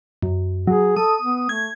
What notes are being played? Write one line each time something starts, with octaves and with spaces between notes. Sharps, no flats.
F#2
F#3 G#4
A4 D#6
B3
A3 G#6